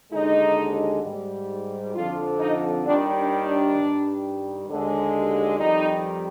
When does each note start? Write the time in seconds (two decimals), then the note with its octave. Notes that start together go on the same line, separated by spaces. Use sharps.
0.12 D#2 D3 G#3 D#4
1.03 G#2 G3
1.94 F2 D3 F3 F4
2.40 D#4
2.85 D#2 D#3 G3 D4
3.16 D4
3.47 D4
3.76 G2 D#3 G3
4.68 D#2 D3 G#3
5.58 F2 D#3 G3 D#4